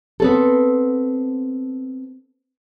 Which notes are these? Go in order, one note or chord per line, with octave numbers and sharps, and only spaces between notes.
B3 C4 A4